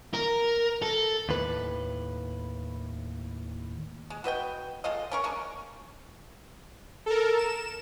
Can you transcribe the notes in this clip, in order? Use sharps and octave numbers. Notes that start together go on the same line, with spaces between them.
A#4
A4
D#2 A2 B4
G#3
F#4 B4 D#5 G5
G#3 A3 F4 D#5
C#4 A#4 C#6
G#3 C#4 D4
A4 A#4
E7